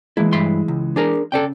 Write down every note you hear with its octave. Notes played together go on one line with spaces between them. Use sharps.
E3 G#3 A#3 E4
G2 E4 C6
C#2
D4 G#4 A#4
C#3 A4 D5 G5